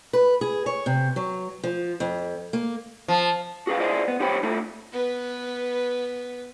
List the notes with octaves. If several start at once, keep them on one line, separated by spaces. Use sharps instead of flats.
B4
G#4
C#5
C3
F#3
F3
F2
A#3
F3
F#4 G#4 B4 F5
E4 G#4 C5 D5 D#5
B3
D#4 G4 C5 C#5 G5 B5
A3 D#4 E4 A4
B3 B4